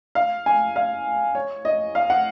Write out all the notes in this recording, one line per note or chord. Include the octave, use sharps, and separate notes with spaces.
F5
G#5
F5
C#5
D#5
F5
F#5